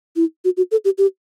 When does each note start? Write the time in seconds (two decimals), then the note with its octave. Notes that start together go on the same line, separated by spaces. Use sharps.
0.16 E4
0.45 F#4
0.57 F#4
0.71 A4
0.85 G4
0.98 G4